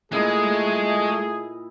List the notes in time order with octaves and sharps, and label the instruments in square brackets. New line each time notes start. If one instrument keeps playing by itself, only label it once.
[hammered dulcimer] A#2 E4 D#5 [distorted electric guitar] G#3 [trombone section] A3 [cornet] G#4